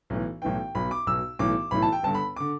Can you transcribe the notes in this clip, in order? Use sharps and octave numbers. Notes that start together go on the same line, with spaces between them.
B1 A2 E3
B1 A2 E3 G5
B1 B2 B5
D6
B1 B2 E6
B1 A2 E3 D6
B1 A2 E3 B5
A5
G5
G1 G2 D3 A5
B5
D3 D6